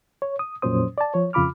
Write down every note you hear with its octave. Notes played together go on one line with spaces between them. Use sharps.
C#5
D#6
F2 A#2 F#3 C#4 C5 D#6
D5 A5
F3 C#5
F2 C#3 F4 B5 D6 F6